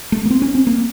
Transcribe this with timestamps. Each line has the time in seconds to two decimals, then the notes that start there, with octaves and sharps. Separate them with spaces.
0.12 A3
0.25 A#3
0.30 C4
0.42 C#4
0.55 C4
0.67 A#3